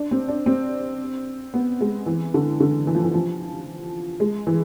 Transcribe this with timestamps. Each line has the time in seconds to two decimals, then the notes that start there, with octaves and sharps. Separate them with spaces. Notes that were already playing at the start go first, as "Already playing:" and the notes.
Already playing: D4
0.11 C4
0.28 D4
0.46 C4
1.54 B3
1.81 G#3
2.06 E3
2.34 D3
2.60 D3
2.87 E3
2.95 F3
3.04 E3
3.14 F3
4.20 G#3
4.47 E3